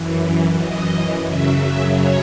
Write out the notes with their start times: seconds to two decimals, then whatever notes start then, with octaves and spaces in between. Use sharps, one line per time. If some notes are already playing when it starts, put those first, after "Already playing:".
Already playing: F#2 E3
0.57 D#5
1.24 F#2 C#3 F#3 E5
1.58 E5
1.93 C#5